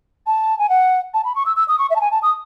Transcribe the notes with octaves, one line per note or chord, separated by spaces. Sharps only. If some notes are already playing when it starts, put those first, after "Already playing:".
A5
G#5
F#5
A5
B5
C#6
E6
E6
D#6
C#6
E5
A5
G#5
A5
D#6